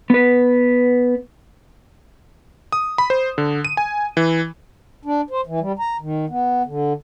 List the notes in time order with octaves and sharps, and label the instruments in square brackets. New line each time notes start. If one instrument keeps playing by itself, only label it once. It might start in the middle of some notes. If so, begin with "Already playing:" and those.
[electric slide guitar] B3 B4
[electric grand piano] D#6
B5
C5
D3
D#7
G#5
E3
[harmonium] D4
C5
E3
G3
A#5
D#3
B3
D3